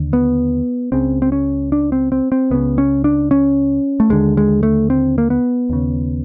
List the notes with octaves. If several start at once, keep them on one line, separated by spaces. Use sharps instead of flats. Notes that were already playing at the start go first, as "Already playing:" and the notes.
Already playing: D#2 D3
B3
C#2 C#3 C4
C4
C#4
D4
C4
C4
C4
C#2 C#3 B3
C#4
D4
C#4
A3
D#2 D3 G#3
G#3
A3
C4
A#3
B3
D#2 C#3